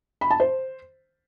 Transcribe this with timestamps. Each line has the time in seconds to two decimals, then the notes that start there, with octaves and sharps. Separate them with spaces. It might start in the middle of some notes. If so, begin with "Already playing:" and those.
0.21 B5
0.31 A5
0.40 C5